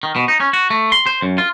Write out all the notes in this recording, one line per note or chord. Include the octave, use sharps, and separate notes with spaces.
D#3
B2
D#4
C#4
F#4
A3
C6
C5
F#2
F4